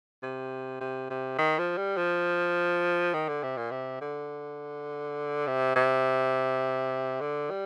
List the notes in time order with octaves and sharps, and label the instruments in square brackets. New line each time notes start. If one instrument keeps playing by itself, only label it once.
[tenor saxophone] C3
C3
C3
D#3
F3
G3
F3
D#3
D3
C3
A#2
C3
D3
C3
C3
D3
G3